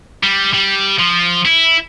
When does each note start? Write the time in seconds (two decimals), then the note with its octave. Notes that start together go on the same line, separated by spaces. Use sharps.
0.24 G3
0.54 G3
0.99 F3
1.46 E4